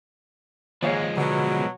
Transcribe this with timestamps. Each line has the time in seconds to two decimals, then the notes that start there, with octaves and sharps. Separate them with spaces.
0.83 D#2 G#2 F3 G#3 C#5 F5
1.18 B2 D3 F#3